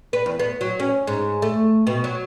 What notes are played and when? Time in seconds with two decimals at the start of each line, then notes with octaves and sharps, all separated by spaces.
0.13 B4
0.26 E2
0.39 B3
0.61 F#3
0.80 C#4
1.07 G#2
1.42 A3
1.87 B2
2.04 F#3